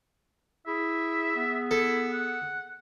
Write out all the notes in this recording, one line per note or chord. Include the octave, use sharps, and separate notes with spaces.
E4 G#4 E5
B3
E4 A4
F#5